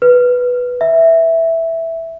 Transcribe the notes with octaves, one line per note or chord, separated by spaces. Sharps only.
B4
E5